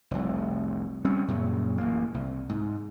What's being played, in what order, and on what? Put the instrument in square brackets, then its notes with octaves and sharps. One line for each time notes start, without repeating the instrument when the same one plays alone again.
[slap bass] F1 C2
G3 C4 C#4
F#2 A#2 C#3
A1 A#3
C2
G#2